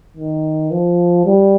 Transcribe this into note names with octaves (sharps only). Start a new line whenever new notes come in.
D#3
F3
G3